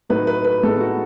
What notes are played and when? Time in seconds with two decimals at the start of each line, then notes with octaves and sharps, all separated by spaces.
0.09 A2 F#3 A3 D#4 B4
0.27 B4
0.45 B4
0.63 A2 G#3 B3 D#4 A4
0.81 F#4